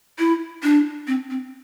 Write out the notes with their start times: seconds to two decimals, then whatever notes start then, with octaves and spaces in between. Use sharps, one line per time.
0.19 E4
0.63 D4
1.07 C4
1.30 C4